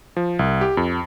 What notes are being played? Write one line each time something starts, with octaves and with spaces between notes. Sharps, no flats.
F3
C2
G4
F2